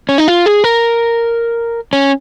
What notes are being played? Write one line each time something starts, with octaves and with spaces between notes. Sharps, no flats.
C#4
D#4
F4
G#4
A#4
C#4